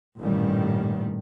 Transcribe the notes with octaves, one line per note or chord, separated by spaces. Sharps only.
A1 G2 A#2 D#3 G3